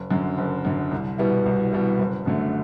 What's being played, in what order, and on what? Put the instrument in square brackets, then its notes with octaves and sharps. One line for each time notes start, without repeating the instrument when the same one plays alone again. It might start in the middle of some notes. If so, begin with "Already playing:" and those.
Already playing: [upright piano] F#1
F#2 D3
F#1
F#2 D3
C2
B2 G3 B3 E4
C2
B2 G3 B3 E4
F#1
F#2 D3 A3